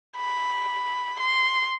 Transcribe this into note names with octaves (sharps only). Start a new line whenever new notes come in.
B5
C6